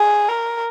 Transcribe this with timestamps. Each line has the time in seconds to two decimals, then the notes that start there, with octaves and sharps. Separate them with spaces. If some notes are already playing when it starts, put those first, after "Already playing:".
Already playing: G#4
0.29 A#4